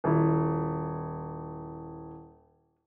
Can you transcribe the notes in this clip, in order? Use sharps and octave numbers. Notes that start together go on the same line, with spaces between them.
D#1 E4